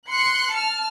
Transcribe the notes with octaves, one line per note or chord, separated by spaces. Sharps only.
C6 F#6 C#7
A5 F6